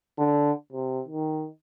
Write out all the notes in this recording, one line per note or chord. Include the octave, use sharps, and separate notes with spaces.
D3
C3
D#3